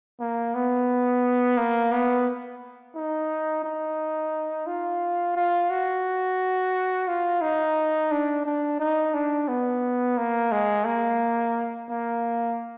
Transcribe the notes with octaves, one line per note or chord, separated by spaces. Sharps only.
A#3
B3
A#3
B3
D#4
D#4
F4
F4
F#4
F4
D#4
D4
D4
D#4
D4
B3
A#3
G#3
A#3
A#3